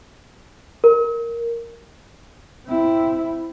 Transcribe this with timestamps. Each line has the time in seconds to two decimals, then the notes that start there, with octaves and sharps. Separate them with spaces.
0.84 A#4
2.66 C4 E4